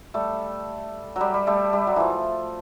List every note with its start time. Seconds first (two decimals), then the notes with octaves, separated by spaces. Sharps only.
0.14 G3 A3
1.16 F#3 G3
1.34 G3
1.47 G3 A3
1.73 G3
1.87 F#3
1.96 E3 F3